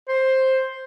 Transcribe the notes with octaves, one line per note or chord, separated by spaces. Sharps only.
C5